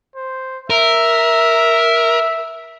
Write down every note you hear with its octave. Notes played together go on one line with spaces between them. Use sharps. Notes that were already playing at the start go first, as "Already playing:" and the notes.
C5
A#4 E5